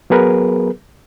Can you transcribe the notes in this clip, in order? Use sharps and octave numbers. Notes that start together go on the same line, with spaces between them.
F#3 B3 G#4 A#4 B4